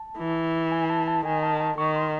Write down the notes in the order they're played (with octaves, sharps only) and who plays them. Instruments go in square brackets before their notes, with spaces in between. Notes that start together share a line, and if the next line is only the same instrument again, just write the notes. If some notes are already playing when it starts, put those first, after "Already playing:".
Already playing: [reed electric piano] A5
[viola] E3
[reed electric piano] G#5
A5
A5
[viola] D#3 [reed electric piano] G#5
[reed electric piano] A5
A5
[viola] D#3 [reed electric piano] C#6
[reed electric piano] C6